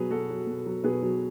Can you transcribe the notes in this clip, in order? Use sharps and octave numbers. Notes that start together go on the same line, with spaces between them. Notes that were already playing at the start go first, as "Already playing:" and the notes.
Already playing: B2 F#3 G#4 B4
B2 F#4 A4
F#3
B2
F#3
B2 G#4 B4
F#3